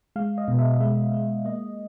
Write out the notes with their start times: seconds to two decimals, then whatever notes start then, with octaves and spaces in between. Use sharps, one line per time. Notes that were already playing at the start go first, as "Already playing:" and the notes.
0.16 G#3 F5
0.38 D#5
0.48 B2
0.59 E5
0.81 G#3 E5
1.13 G#3
1.45 A#3 D#5